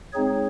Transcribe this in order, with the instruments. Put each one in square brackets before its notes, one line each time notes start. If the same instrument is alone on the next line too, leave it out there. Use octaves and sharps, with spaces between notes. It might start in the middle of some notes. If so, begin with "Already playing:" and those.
[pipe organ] G#3 C4 D#4 G#4 C#5